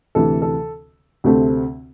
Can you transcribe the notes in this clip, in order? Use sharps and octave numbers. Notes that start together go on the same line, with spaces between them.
D2 C3 E3 A4
A4
D2 C3 A3 C4